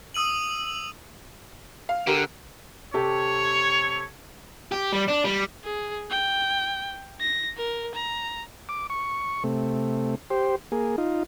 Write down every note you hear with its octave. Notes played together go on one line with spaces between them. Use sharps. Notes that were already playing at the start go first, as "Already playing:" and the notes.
D#6 E6 D#7 F#7
F5
D3 G4 A#4
C3 G4 A4 C#5
G4
G3
D4
G3
G#4
G5
A#6
A#4
A#5
D6
C#6
C3 A3
G4 C5
A#3 G#4
D#4 F4